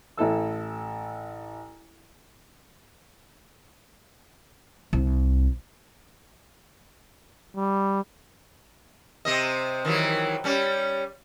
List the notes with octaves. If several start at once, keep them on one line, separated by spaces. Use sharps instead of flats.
A1 E4 A4 E6
C2
G3
C3 C4 D#5
D#3 E3 F#3
G3 C#4